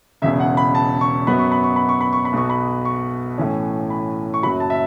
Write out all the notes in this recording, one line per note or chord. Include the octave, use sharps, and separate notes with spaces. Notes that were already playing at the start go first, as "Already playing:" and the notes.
E1 E2 C#3 E5
F#5
B5
A5
C#6
F#2 F#3 B3 B5
C#6
B5
C#6
B5
C#6
B5
C#6
B5
B1 B2 B3 C#6
B5
C#6
A2 E3 C#4
B5
C#6
F#1 F#2 F#3 B5
A5
E5